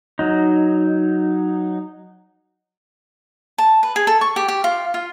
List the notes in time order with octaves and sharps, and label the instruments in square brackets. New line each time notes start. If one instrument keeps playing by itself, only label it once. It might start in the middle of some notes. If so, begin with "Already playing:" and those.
[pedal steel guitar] F#3 D#4
[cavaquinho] A5
B4
G#4
A4
C#6
G4
G4
F4
F4